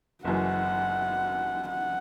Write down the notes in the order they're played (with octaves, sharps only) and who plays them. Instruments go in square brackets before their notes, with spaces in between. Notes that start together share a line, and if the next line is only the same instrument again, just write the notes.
[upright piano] F#1 F#2 E3 [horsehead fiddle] F#5
[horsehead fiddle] F#5